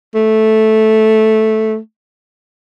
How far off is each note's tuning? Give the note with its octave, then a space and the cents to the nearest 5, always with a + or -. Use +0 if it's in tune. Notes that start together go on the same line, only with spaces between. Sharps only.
A3 -5